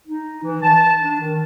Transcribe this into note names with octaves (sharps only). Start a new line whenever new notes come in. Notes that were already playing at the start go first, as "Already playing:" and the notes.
D#4
E3
A5
D4
D#3